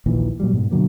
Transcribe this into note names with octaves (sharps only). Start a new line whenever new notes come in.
A#1 D#2 A#2 E3
A#2 F#3 G3
G#2 B2
B2 D3 F#3 A#3